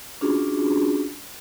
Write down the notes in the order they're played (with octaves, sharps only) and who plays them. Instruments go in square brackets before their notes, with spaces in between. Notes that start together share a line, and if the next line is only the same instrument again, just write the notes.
[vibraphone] C#4 D4 F4 F#4 G#4